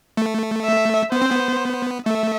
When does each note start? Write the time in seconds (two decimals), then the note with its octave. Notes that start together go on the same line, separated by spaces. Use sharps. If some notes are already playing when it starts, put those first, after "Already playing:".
0.17 A3
0.64 E5
1.12 B3 C5
1.22 C4
1.31 B3
2.06 A3 E5